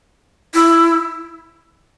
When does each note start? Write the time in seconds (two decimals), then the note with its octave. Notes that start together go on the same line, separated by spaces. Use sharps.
0.54 E4